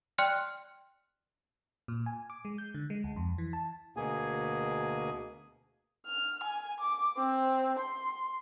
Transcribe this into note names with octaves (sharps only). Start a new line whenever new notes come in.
D5 G5 C6 F6 F#6 C#7
A#2
G#5
D6
G#3
G6
D3
G#3
D2
F2
E3
A5
D2 B2 A#3 G#4 G#5
F6
G#5
D6
C4
C6